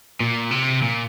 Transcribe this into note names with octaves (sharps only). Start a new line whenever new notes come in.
A#2
C3
A#2